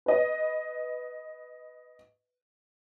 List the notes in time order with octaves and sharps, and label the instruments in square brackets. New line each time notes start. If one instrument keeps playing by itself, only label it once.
[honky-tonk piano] B4 D#5